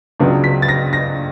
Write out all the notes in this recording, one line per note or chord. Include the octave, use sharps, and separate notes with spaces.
C#2 C#3 F#3 B3 D4
B6
A6
A#6
A#6